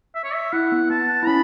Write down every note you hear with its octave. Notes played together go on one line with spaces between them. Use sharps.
E5
C#5
E5
E4 F#5
B3
B3 A5
E4
C#4 B5